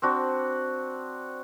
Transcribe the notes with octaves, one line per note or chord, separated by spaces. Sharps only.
C4 D4 F#4